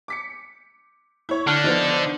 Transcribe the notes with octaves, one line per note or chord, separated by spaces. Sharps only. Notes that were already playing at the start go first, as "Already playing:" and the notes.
D6 B6 C#7
E4 C#5
D3 D4 F6 F#6
D#3 F3 B3